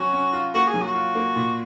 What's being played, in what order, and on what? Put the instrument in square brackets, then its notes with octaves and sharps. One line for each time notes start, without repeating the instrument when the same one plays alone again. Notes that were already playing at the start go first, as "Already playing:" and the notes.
Already playing: [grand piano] F#3 C#4 [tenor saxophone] F#4
[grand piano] C#4
F4
[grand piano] A#3 [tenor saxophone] F#4
[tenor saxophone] G#4
[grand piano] F#3
[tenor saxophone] F#4
[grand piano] F4
A#3
A#2